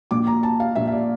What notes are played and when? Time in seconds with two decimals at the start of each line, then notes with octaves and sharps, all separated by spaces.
0.11 A#1 A#2 D6
0.27 A#5
0.43 A5
0.60 F5
0.75 A#1 A#2 E5
0.87 E5
0.92 D5